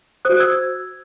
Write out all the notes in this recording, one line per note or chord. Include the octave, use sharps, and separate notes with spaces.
F#4 C5 D#6 F#6
E6 G#6